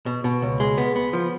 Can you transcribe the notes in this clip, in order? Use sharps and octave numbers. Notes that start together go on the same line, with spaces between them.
B2
B2
C#2
G#3
B3
B3
F3